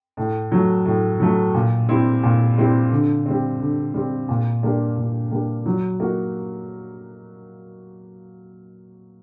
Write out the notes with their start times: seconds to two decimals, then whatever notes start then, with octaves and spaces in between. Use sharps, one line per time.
0.17 A2
0.52 F#3 A3
0.86 A2
1.20 F#3 A3
1.54 A#2
1.89 G3 C4 E4
2.23 A#2
2.58 G3 C4 E4
2.91 D3
3.26 G3 C4
3.60 D3
3.94 G3 C4
4.29 A#2
4.63 G3 A#3 D4
4.97 A#2
5.31 G3 A#3 D4
5.66 F#3
6.00 A#3 D#4 F#4